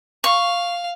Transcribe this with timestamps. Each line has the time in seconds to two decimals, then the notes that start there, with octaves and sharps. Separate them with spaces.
0.24 F5 C#6